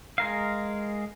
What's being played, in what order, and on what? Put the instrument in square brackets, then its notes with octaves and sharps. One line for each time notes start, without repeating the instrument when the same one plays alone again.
[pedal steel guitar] G#3 A#4 F5